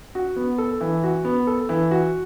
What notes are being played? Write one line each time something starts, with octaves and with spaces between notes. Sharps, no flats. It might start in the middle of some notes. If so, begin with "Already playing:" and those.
F#4
B3
A4
E3
F#4
B3
A4
E3
F#4